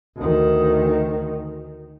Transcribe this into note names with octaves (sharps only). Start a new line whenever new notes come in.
D2 D#3